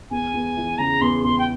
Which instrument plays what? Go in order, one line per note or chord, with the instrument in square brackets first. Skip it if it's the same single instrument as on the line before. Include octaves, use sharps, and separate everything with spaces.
[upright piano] E2 [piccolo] G#5
[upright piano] E2
E3
[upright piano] C#3 [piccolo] A#5
[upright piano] E2 [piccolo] C6
[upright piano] E2 [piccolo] C6
[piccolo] G5